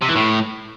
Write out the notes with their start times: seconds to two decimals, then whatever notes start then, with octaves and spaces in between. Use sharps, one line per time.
0.02 C3
0.09 E3
0.16 A2